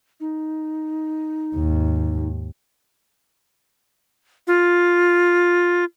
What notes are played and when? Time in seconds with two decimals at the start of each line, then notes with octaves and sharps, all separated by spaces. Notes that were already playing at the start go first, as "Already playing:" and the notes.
0.20 D#4
1.56 D#2 G#2
4.47 F4